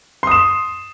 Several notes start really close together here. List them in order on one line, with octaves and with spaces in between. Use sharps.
C6 D#6 E7